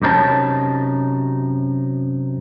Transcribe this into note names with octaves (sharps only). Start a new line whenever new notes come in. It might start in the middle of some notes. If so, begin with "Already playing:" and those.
F#2 C3 D#4 A#4 C#5 A5